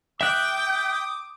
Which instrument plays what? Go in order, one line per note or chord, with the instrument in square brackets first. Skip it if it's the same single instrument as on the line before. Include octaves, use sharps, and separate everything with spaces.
[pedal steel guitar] E5 F#6 [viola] G5 [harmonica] D6 D#6